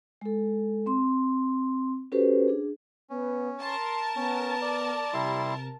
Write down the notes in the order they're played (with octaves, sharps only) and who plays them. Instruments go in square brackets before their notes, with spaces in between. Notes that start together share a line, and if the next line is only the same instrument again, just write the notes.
[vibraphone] G#3 A4
C4 C6
C#4 F#4 G4 A4 B4 C5
D4 G#4
[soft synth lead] B3 [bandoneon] C#4
[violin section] A#4 A5 [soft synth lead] C6
[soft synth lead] B3 [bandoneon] C#4
[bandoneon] D5
[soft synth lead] C3 [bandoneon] G3 E4 C6